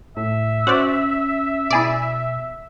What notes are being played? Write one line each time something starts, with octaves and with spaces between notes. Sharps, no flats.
A2 E5
C#4 F#4 C5 D5
B2 E4 G#4 D5